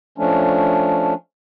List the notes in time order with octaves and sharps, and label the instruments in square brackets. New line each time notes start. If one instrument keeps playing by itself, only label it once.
[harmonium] F3 A3 C#4 D4